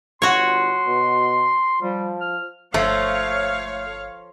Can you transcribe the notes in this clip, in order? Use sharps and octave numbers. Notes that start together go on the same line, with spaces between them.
G1 F#4 C#5 C6
B2
F3 G3
F6
G1 F3 A3 C#5 F5